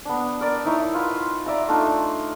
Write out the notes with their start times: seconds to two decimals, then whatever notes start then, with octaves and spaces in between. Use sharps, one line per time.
0.05 B3 D4
0.41 A#4 D5
0.65 D#4 E4 C#5
0.94 F4 B4 F#5
1.46 D5 E5 F#5 A#5
1.69 A3 D4 D#4 F4